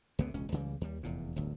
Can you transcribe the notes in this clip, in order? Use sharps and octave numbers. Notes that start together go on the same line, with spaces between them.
C#2 F#2 C3 B3
E1 C#2 C#4
C#2 C#3 E3 G3
D#2 G3
F1 E2 A#2
D1 G1 D2